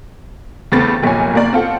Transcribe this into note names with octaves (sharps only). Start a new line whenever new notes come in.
E2 C#3 A3 C4 B4 A6
F1 B1 A#2 C#5 G#5
F#1 A#3 D5
C4 F4 A4 F#5